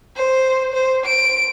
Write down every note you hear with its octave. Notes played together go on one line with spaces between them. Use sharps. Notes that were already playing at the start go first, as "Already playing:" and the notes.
C5
C5
D7